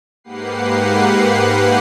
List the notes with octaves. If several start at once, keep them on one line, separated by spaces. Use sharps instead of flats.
G#2 A#3 G4 B4 F#5 C7